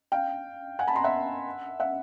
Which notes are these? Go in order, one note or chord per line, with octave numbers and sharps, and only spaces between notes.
F5 G5
F#5 G#5
A5 B5
A#5 C6
E5 F#5
E5 F#5